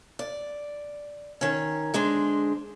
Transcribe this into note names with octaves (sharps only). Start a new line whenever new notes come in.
D5
D#3 C#4
D3 G#3 D4 C5